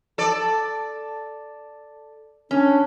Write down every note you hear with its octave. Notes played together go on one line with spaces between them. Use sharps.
A4 D5
C#4 D4